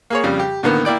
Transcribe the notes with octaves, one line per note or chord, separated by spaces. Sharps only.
A#3 G#4 C#5
F2 C#3 G3
G4
A2 D3 D#3 A#3 B3
A#3 E4 D5 G5